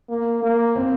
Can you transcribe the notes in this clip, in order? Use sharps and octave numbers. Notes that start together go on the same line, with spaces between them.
A#3
A#3
C4